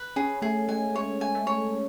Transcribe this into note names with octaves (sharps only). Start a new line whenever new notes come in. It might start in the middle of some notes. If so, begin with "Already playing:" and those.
Already playing: B4
C#4 G#4
A3 G#4
G#3 G#5
G#3 C#5
G#5
A3
C#5